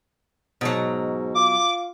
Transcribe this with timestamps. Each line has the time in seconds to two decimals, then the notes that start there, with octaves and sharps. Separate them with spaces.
0.61 G#2 B2 F#3
1.35 F4 D6